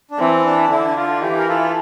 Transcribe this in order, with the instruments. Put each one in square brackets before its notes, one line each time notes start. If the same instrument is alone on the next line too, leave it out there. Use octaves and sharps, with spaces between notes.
[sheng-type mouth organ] D4
[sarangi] E3 [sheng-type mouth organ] C4
[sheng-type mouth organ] D4
[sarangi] D3 [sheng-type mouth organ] E4
[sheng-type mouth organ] F4
[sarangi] E3 [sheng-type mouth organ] G4
[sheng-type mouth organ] A#4
F4 A4